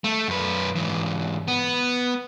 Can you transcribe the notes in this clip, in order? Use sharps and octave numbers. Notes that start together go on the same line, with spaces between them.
A3
F#2 B4
G#2 E3
B3